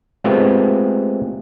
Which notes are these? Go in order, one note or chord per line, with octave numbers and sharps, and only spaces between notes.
G#3 A3 B3 C4 F4 G4